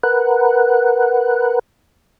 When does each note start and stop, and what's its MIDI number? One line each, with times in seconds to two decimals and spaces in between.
0.03 1.59 70
0.03 1.59 71
0.03 1.59 78